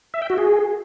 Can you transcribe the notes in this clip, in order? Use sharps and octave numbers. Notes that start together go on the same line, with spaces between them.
E5
G5
F#4
G#4